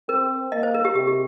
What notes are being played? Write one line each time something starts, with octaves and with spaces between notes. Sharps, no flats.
C4 A#4
A#3 D#5
C5
A#4
G4
C3 G4
G4